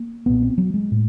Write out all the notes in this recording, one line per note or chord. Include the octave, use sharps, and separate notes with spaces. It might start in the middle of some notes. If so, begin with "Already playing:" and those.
Already playing: A#3
B1 A#2 B3
C4
F#3
G#3
A2